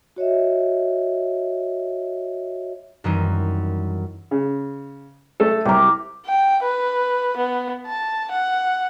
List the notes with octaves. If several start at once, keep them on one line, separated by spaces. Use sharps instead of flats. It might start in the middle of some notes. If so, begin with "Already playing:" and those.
F#4 C#5 D#5 E5
F#2 D#3 E3 G3 C4 D#4
C#3
A3 A4
C2 G4 A#4
G5
B4
B3
A5
F#5